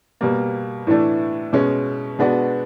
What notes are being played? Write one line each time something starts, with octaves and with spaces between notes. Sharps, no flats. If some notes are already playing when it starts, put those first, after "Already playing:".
B2 G3 A#3
A2 E3 A3 D4
B2 G#3 C#4
B2 G#3 B3 D4 F#4